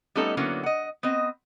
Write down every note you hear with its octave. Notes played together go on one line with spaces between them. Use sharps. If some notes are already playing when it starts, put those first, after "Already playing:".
G3 A3 B3 C#4 D#4 A4
D3 F#3 A#3 B3 C#4 E4
D#5 F#5
B3 C4 D#5